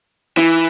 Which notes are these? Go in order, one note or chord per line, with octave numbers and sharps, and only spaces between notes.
E3